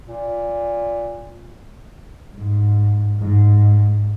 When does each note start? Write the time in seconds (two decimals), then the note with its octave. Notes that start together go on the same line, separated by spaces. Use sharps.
0.07 A#2
2.35 G#2
3.18 G#2